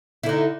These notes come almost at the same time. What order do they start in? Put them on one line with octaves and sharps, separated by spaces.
E4 D3 D#4